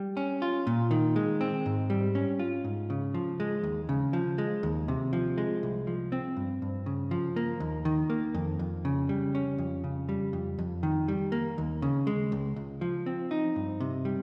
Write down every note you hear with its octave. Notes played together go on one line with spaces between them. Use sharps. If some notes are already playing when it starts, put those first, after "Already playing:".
Already playing: G3
C#4
F4
A#2
D#3
G#3
C4
G#2
G3
C#4
F4
G#2
C#3
F3
G#3
D#2
C#3
F3
G#3
D#2
C3
F3
G#3
C2
F3
C4
G2
G2
C#3
F3
A#3
D#2
D#3
A#3
F2
F2
C#3
G3
C#4
F2
C#3
G3
F2
F2
D#3
G3
A#3
D#2
C#3
G#3
C#2
C#2
F3
C4
D#4
G2
C3
G3